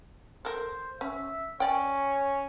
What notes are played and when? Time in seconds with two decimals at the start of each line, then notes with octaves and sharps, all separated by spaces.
0.45 A4 A#4 C5
1.01 C#4 E5
1.60 C#4 C#5 D5 G5